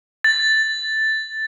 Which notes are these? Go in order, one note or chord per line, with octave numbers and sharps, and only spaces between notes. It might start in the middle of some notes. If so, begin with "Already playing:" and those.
A6